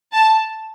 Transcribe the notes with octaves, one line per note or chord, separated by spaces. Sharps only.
A5